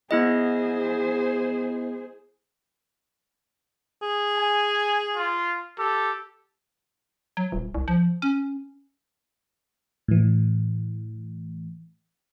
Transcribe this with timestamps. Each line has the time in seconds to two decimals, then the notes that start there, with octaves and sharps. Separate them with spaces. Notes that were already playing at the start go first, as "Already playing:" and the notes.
0.11 B3 E4 G#4 C5 D#5
4.02 G#4
4.37 G#5
5.16 F4
5.79 G4 A4
7.37 F#3
7.52 D#1
7.75 C2
7.88 F3
8.22 C#4
10.08 A2 E3